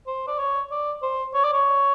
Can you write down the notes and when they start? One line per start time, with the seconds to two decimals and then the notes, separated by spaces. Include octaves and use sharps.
0.07 C5
0.28 D5
0.39 C#5
0.71 D5
1.03 C5
1.34 C#5
1.44 D5
1.53 C#5